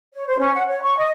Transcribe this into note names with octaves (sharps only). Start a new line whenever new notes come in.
C#5
C5
C#4
F#5
C#5
C#6
D#5